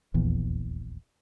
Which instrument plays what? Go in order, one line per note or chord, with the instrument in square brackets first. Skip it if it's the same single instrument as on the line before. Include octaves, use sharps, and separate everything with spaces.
[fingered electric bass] D#1 A#1 E2 E3